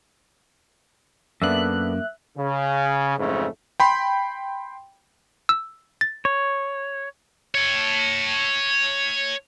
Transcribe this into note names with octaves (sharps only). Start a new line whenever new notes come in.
F#2 A#3 B3 D4 A4 E5 F#6
C#3
F2 G#2 C#3 E3 A3
G5 B5 C6
E6
A6
C#5
C#5 A5